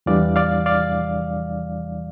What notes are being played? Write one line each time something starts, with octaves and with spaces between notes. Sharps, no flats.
E2 E3 G3 D4 D5 F5
D5 F5
D5 F5